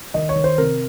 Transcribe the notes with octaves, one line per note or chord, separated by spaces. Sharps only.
D#3 D#5
C#5
D#3
C5
C3 A#4